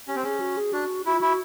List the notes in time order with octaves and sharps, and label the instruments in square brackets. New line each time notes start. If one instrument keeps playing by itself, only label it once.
[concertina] C#4 [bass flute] G4
[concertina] C4
[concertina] C#4 [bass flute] G#4
[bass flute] F#4
G#4
[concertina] D4 [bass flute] F#4
[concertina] E4 [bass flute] F#4
[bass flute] F4
[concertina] E4 [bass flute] F#4